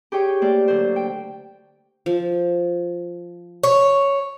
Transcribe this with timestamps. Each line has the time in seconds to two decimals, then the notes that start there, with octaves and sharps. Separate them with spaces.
0.12 G4 G#4 C#5 G5
0.42 A3 A#3 C5 D5
0.68 D3 F#3 C5
0.96 G5
2.06 F3
3.63 C#5